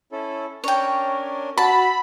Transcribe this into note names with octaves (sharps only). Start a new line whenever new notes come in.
C#4 E4 A4
C#4 D4 A#4 C#5 G5
F#4 A5 B5 E6